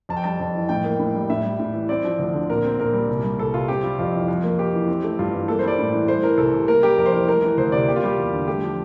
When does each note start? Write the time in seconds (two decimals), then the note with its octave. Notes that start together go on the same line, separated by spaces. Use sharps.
0.09 F2 A5
0.17 G5
0.24 G3 A5
0.40 F2
0.55 E3
0.69 A2 G5
0.84 A#3
0.99 A2
1.15 G3
1.30 A2 E5
1.44 G3
1.59 A2
1.74 E3
1.89 C4 D5
2.04 F3
2.19 D2
2.34 D3
2.50 A#2 A#4
2.64 C4
2.79 A#2 A#4
2.93 G3
3.09 C2
3.24 G3
3.38 C2 A4
3.54 C3 F4
3.68 C4 G4
3.83 G3 F4
3.99 F2 F4
4.14 E3
4.28 F2
4.43 A#3
4.58 F2 G4
4.74 E3
4.88 C4
5.04 A3
5.19 G2 F4
5.34 E3
5.48 A#3 A4
5.59 G3 C5
5.68 D5
5.79 A2
5.93 E3
6.08 A3 C5
6.23 E3 A#4
6.37 C2 A4
6.54 C3
6.68 A#3 A#4
6.83 G3 G4
6.97 F2 A#4
7.06 C5
7.13 E3 A#4
7.28 A3 A#4
7.43 E3
7.57 D2 C5
7.72 C3 D5
7.88 A#3 G4
7.96 F4
8.03 G3 G4
8.18 E2
8.33 D3
8.48 A3 G4
8.62 F3